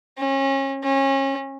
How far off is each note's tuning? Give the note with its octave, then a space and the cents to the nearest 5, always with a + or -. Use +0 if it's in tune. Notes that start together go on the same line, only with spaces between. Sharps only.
C#4 -30
C#4 -30